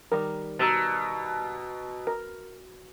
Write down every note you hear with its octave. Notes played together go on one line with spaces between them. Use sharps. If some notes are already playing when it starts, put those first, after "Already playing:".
D#3 G3 A#4
B2 A#5 E6 A6
A#4